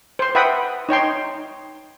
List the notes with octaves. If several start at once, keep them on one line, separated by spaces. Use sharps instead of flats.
C5 C6
B4 E5 F#5 G5 B5 D#6
D#4 C#5 G5 C6